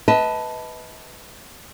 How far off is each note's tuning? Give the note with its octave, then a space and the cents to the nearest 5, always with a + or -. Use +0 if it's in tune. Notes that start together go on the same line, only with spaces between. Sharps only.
B4 +0 D#5 +35 A5 +0